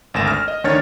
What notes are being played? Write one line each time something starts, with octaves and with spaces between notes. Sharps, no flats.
G#1 D2 A#6 E7
F6
D#5
D2 D#3 D4 C#5 F6 A6